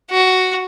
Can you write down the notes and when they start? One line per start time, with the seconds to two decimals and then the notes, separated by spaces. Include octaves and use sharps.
0.11 F#4